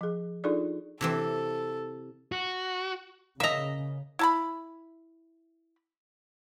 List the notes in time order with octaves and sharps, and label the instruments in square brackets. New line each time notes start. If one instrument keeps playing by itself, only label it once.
[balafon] F3 G#4
D4 D#4 F4 G#4 A4 D5
[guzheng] C3 E3 C4 [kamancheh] A4
[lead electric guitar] F#4
[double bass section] C#3 [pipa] A#3 D#5 [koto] E5 A#5
[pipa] E4 A5 B5